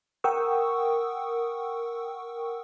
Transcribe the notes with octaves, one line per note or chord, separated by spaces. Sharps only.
A#4 F#5 G5 C#6 D#6 E6